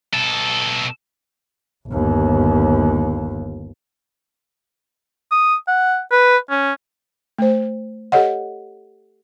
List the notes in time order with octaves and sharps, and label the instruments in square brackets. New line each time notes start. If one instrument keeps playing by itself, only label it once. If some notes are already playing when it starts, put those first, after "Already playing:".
[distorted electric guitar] B2 A4
[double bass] G1 D#2
[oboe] D#6
F#5
B4
C#4
[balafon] A3 C5
G4 A4 C#5 D#5 F#5